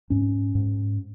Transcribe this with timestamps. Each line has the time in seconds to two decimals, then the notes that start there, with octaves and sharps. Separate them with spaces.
0.10 G#2 C#4
0.55 G#2